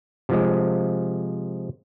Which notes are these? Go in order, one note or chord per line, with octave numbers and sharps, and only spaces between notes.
C3 F3 G#3